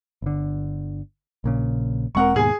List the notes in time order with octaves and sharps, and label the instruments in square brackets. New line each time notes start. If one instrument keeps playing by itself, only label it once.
[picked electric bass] G1 D3
A#1 A#2 C#3
[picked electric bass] E1 G#3 C4 [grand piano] A#4 F#5 C#6
[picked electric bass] D#2 G#2 B2 [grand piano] G#4 G#5